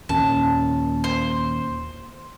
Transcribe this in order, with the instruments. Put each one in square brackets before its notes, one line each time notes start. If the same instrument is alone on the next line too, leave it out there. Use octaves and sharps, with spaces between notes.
[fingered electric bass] D#2 A#2 C#4 [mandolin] A5
[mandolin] C5